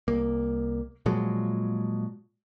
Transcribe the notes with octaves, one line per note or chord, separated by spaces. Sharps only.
C2 A#3
A#2 F3 F#3 G#3